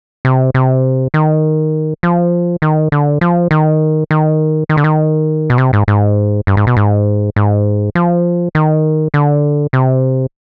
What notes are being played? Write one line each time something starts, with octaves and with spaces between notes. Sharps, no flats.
C3
C3
D#3
F3
D#3
D3
F3
D#3
D#3
D#3
D3
D#3
B2
C3
G#2
G#2
G2
G#2
B2
G#2
G#2
F3
D#3
D3
C3